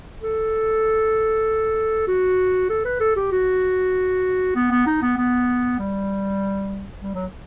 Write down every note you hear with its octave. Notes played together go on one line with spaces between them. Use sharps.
A4
F#4
A4
B4
A4
G4
F#4
B3
B3
D#4
B3
B3
G3
G3
F#3